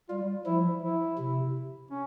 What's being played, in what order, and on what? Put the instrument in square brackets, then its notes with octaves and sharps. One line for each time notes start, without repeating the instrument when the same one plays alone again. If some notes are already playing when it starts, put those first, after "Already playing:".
[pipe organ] G3 [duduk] F4
[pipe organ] F3 [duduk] E4
[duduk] E4
[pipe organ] C3
[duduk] C#4